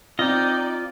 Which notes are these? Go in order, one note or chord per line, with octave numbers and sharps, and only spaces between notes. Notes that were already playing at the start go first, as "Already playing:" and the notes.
C4 D#4 F4 D5 D#5 G5